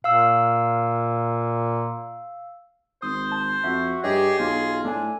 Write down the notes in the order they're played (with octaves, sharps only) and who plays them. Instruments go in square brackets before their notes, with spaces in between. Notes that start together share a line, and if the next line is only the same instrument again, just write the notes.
[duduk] A#2 [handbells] F5 E6
[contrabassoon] G#1 [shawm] C5 [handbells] D#6
[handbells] A5
[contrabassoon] F2 [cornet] F#4 [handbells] E5
[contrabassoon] G2 [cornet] G4 [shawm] G#4 [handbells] C#5 D#5
[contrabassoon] B1 [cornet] F4
[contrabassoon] A2 [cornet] D4 [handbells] A4 G#5